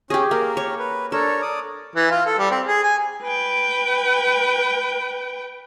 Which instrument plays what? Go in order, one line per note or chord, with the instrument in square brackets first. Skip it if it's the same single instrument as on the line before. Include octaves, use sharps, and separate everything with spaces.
[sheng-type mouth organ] C#4 [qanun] G4 G#4
[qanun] A#3 [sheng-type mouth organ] G4 A#4
[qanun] C#5
[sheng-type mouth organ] B4
[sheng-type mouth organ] D4 A#4 C#5 [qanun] A4
[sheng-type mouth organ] D5 D6 D#6
[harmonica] E3
F4
A4
G3
C4
G#4
G#5
[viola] B4 G5